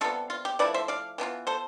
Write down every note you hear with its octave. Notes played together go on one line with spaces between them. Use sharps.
C3 G3 B3 F4 A4
F4
G4
F3 A3 E4 B4 D5
C5 E5
D5 F5
E3 B3 D4 F4
A4 C5